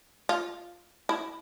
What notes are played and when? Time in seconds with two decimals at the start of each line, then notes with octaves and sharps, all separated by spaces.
0.29 F4
1.09 E4